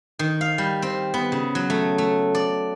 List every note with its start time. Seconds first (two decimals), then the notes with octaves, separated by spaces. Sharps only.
0.19 D#3
0.41 F5
0.58 G3
0.82 C4
1.14 B3
1.32 C#3
1.55 F#3
1.70 A3
1.98 A3
2.35 D5